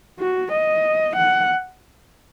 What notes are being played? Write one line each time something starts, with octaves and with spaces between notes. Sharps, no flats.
F#4
D#5
F#5